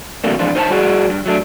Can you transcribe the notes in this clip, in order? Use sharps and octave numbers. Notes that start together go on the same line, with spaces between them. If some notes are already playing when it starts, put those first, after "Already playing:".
C3 E3 F#3 A3 A#3 D4
F2 G#2 E3 F3 D4 F4
D#4 C5 C#5 F#5 A5
G3 E4 F#4 G#4 D5 F#5
G2
F#3 A3 D4